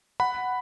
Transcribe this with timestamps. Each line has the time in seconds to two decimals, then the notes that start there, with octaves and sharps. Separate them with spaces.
0.20 F#5 B5